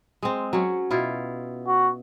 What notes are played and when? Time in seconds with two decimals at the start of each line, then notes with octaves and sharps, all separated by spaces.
0.23 G#3 C4
0.53 F#3 C#4
0.91 B2 E4 F4
1.67 F#4